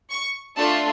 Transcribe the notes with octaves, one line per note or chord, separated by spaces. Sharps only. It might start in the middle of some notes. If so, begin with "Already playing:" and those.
C#6
A3 D4 F4 A5